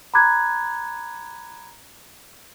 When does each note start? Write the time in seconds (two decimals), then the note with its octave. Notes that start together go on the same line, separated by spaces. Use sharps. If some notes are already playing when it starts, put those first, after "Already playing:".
0.14 A#5 B5 D6 F#6 G#6